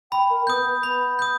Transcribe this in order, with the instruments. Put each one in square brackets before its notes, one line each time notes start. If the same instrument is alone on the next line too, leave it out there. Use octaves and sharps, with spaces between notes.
[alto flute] G5 [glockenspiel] B5
[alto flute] A#4
[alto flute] B3 [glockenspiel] D#6 G6
[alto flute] B3 [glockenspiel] B5
[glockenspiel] D#6 G6